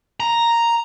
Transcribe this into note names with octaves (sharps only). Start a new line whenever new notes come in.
A#5